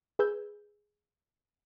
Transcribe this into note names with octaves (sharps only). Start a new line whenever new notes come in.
G#4 B4 E6 G6 G#6